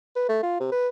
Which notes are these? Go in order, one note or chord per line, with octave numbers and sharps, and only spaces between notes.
B4
A3
F4
C3
B4